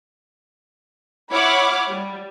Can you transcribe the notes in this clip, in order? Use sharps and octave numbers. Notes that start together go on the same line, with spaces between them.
E4 C#5 F#5 B5 D6 F6
G3